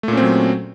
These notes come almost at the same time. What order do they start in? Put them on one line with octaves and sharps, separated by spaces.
A3 A#2 C#4 C4 F#3